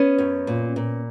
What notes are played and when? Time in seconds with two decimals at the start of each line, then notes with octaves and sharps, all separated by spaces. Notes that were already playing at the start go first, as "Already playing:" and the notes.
Already playing: B3 C#4
0.18 F#2
0.47 A#2
0.76 A#2